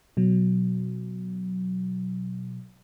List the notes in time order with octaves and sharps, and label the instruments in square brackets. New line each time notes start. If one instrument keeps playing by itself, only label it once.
[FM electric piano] B2 F#3